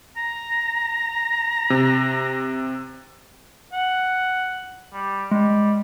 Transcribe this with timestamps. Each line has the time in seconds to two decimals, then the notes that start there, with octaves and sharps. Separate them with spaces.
0.17 A#5
1.70 C3
3.73 F#5
4.93 G3
5.31 G3 G#3